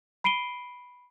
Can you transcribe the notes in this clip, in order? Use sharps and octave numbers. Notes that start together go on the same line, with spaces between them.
B5 C7 D7 D#7 G7